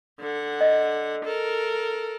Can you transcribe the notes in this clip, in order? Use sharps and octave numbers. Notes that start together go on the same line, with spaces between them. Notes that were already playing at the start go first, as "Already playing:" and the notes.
D3 F#5
D#5
A4 A#4